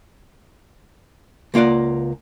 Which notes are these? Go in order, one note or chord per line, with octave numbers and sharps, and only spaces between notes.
C#2 A#3 F4 D5 F#5